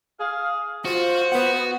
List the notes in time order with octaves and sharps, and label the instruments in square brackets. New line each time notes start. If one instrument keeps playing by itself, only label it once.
[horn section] G#4 F5
[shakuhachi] F4 [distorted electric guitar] F#4 [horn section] C5
[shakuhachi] B3 [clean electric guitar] B4 F#5